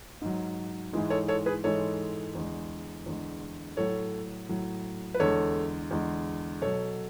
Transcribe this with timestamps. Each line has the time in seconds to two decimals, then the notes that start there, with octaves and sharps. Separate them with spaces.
0.22 G#2 F#3
0.93 G#2 E3 G#3
1.10 A4 C#5
1.28 A4 C#5
1.46 G#4 B4
1.64 G#2 E3 G#3 A4 C#5
2.35 E2 D3 G#3
3.06 E2 D3 G#3
3.77 A2 F#3 A4 C#5
4.49 A2 F#3
5.14 B4
5.20 E2 D3 G#3 A4 C#5
5.91 E2 D3 G#3
6.62 B2 F#3 A4 C#5